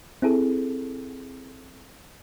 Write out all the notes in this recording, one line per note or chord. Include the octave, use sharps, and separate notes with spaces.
C4 E4 G#4 A4